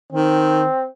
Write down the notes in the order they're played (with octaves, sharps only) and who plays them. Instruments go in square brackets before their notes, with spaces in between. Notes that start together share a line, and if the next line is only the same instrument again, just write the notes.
[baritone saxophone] D#3 [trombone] C4